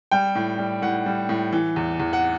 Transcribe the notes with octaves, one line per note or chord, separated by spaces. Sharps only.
G3 G5
A2
G3
A2 F#5
G3
A2
E3
E2
E2
F#5